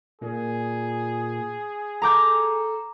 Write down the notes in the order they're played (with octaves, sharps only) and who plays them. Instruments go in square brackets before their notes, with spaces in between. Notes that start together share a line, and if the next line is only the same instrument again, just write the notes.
[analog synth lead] A#2 [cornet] G#4
[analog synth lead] A4 [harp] A#5 D6 G6